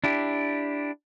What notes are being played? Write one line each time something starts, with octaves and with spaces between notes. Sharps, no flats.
D4 E4 G4